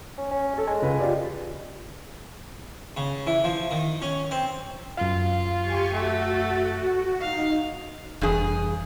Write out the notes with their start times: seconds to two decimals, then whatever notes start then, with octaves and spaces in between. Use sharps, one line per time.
0.18 C#4
0.31 C#4
0.53 A4 C#5
0.67 G#3 G#5
0.82 C#2 B4
1.00 F4 G4 D5
2.97 C#3
3.27 E3
3.44 F3
3.71 D#3
4.02 C#4
4.31 C4
4.97 F#2 F4 F5
5.60 G4 G#5 C#6
5.94 A3 F#4
7.21 D#4 F5
8.21 F1 G2 E3 G#4